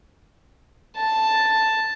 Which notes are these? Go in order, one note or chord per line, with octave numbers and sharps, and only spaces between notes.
A5